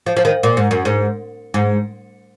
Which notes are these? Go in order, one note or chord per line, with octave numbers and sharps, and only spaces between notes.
F3
F3
D#3
A#2
G#2
F#2
G#2
G#2